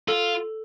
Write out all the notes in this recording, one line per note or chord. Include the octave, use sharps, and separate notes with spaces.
F4 A4